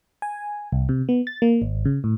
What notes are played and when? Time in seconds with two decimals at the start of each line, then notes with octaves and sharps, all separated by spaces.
0.22 G#5
0.72 C2
0.89 C3
1.09 B3
1.27 A6
1.42 A#3
1.62 G#1
1.85 C#3
2.04 A2